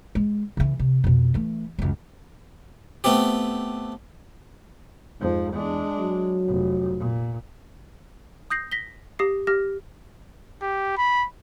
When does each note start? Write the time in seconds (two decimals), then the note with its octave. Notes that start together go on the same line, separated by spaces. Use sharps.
0.15 G#3
0.57 C#3 E3
0.79 C3
1.04 F2 B2
1.34 E3 A3
1.79 C#2 F#2
3.04 A3 B3 C4 G4
5.21 F2 G#2 F3
5.53 E2 G#3 D4
5.99 F#3
6.48 F1
6.99 A#2
8.50 D#6 G6 A#6 C7
8.71 A#6 B6 G7
9.19 G4 D#6 A#6 C7
9.47 G4 F6 A#6
10.62 G4
10.97 B5